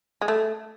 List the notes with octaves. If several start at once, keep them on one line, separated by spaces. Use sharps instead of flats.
G#3
A3